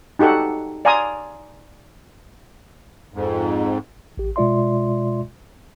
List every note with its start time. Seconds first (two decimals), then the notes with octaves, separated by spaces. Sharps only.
0.19 D#4 F#4 G4 A4 F#5
0.85 D5 F5 G#5 A#5 C6 D#6
3.14 F2 G#2
4.18 A1 G4
4.36 B2 G#3 F4 D5 E5 C6